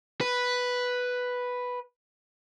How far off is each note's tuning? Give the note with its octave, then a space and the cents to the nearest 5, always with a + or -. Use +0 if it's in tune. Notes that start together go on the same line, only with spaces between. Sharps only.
B4 +0